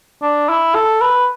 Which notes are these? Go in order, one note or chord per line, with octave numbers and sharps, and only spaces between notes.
D4
E4
A4
B4